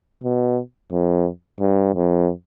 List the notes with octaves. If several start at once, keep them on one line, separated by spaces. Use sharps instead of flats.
B2
F2
G2
F2